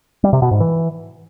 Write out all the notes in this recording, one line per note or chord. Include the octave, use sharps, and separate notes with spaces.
G3
C3
B2
G#2
E3